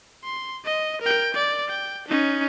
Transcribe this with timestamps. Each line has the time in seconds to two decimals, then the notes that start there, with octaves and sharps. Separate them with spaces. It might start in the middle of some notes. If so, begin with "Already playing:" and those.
0.24 C6
0.65 D#5
1.02 A#4 G5
1.34 D5
1.68 G5
2.08 C#4 D#4